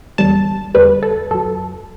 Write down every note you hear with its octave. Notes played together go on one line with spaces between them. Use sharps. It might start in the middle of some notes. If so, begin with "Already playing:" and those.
E2 D3 G3 A5
E2 D3 G3 B4
A4
F#2 F#3 A4